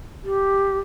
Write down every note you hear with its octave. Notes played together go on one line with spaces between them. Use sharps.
G4